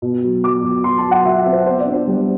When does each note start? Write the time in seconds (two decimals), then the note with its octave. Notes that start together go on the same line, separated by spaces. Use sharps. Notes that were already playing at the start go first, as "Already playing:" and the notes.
0.02 B2
0.24 F#3
0.43 F#3 D6
0.63 B2
0.84 F#3 C6
0.98 A5
1.04 F#3
1.11 F#5
1.25 F#3 E5
1.39 E5
1.46 C4
1.53 C5
1.66 B3 C5
1.80 D5
1.87 D4
1.93 C5
2.07 G3